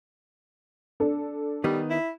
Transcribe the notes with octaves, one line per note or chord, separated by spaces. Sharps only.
D4 A4
D#3 G3 B3 D#4
E4